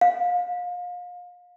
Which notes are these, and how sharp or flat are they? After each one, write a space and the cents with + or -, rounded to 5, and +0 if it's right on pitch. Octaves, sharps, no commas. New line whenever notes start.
F5 +35